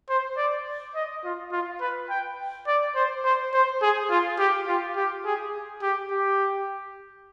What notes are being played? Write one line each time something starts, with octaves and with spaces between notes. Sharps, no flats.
C5
D5
D#5
F4
F4
B4
G5
D5
C5
C5
C5
G#4
F4
G4
F4
G4
G#4
G4
G4